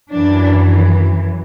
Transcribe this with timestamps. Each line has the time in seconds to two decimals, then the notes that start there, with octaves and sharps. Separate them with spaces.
0.11 F#2 E3 D4